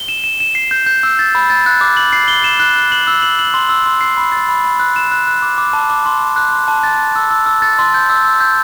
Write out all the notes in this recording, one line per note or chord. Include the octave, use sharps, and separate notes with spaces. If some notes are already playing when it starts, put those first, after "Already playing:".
Already playing: G7
E7
E7
E7
C7
G6
G6
E6
A6
B5
A6
F#6
D6
F#7
C7
G7
E7
F#6
F#6
F#7
E6
F#7
F#7
C6
E6
C6
C7
B5
A6
B5
B5
F#6
E7
F#6
F#6
D6
D6
A5
D6
C6
C6
F#6
C6
A5
A6
A6
E6
E6
E6
A6
C6
G6
E6
E6
G6